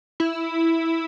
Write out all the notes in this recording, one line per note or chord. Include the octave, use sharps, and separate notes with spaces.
E4